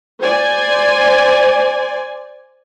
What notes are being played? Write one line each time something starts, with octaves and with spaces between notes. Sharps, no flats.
C5 D5 G#5